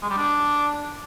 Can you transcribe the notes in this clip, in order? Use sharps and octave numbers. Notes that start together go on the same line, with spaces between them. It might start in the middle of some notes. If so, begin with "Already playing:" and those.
G#3
G3
D4